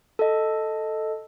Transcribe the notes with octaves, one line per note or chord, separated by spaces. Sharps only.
A4 D#5